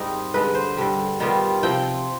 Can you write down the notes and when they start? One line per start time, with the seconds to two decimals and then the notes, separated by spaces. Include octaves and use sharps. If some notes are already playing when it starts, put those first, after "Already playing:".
Already playing: G#2 D#3 G3 C4 D#4 F4
0.34 G2 D3 G#3 B4
0.55 C5
0.77 G2 D3 G3
1.20 D#3 G3 B3 F4
1.63 C3 F3 C4 G5